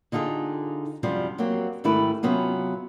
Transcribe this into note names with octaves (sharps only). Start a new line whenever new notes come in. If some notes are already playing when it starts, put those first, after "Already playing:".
D3 D#4 F4 G4 G#4
F#2 C3 F3 G3
F#3 A#3 C4 G4
G#2 D#3 A3 E4 G4 B4
C3 F#3 B3 C#4 F4